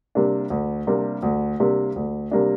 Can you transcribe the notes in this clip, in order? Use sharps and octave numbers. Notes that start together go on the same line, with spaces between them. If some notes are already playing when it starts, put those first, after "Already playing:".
C3 G3 A#3 D4
D2
C3 G3 A#3 D4
D2
C3 G3 A#3 D4
D2
C3 G3 A#3 D4